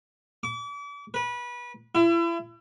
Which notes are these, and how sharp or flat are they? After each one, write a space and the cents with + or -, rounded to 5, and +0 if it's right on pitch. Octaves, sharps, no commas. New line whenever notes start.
D6 -40
B4 -25
E4 +35